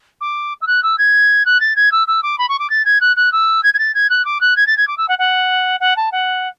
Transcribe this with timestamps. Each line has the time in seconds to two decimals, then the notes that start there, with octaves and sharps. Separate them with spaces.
0.20 D6
0.61 E6
0.67 F#6
0.83 E6
0.98 G#6
1.45 F#6
1.60 A6
1.76 G#6
1.91 E6
2.07 E6
2.22 D6
2.38 B5
2.48 C#6
2.59 D6
2.69 A6
2.85 G#6
3.00 F#6
3.16 F#6
3.32 E6
3.63 G#6
3.73 G#6
3.78 A6
3.94 G#6
4.09 F#6
4.25 D6
4.40 F#6
4.56 G#6
4.66 A6
4.77 G#6
4.87 D6
4.97 E6
5.08 F#5
5.18 F#5
5.80 F#5
5.96 A5
6.12 F#5